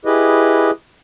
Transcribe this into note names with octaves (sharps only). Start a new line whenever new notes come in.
E4 G4 G#4 B4 D#5